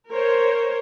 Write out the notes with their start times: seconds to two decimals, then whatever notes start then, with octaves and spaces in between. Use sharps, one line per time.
0.10 A#4 C5 C#5